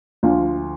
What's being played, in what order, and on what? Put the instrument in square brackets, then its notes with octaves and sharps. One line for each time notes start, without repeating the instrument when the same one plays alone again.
[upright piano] D2 D3 F3 F4